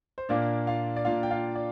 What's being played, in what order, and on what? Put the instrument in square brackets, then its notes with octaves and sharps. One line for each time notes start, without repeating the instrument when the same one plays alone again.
[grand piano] C5
A#2 A#3 D4 D5
F4 F5
D5
A#2 A#3 D4 F4 F5
G5
F4 F5
D5